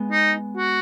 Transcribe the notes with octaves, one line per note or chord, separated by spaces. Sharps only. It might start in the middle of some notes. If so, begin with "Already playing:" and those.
Already playing: G#3 B3
D#4
F#4